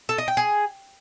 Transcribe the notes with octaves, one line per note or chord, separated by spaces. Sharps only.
A4
D#5
G5
G#4